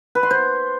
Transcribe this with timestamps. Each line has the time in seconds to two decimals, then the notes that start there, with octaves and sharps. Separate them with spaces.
0.15 B4
0.23 C6
0.31 C5